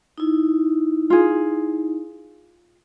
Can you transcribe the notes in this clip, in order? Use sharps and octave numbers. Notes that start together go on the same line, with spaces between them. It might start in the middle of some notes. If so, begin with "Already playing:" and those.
D#4 E4
F4 G#4